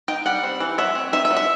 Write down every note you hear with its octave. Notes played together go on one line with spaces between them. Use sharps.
D#4 G5
G3 F#5
C4
E3
F#3 E5
C4
D#4 E5
E5
F#3
E5